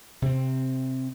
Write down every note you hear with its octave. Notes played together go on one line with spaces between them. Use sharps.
C3 C4